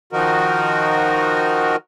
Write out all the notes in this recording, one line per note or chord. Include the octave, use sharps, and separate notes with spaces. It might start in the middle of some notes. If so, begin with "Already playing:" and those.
D#3 F3 D#4 F#4 A#4